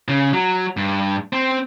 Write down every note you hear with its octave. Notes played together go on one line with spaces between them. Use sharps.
C#3
F#3
G2
C4